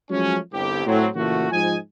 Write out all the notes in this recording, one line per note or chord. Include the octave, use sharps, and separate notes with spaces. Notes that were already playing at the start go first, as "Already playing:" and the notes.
F3 F#3 G#3 A3 C#4
G1 C2 G4
A2 F#3 C4
A#2 C#3 E3 A3 F#4
G#2 F3 F4 D#5 G#5